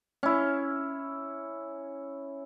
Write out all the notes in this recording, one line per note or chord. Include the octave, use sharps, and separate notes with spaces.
C#4 E4